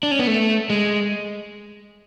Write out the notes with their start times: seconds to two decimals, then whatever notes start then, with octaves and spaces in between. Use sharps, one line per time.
0.03 D4
0.11 C#4
0.19 B3
0.27 A3
0.70 G#3